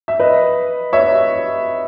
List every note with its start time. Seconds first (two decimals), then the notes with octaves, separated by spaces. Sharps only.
0.08 E5
0.20 B4 D#5
0.93 C#5 E5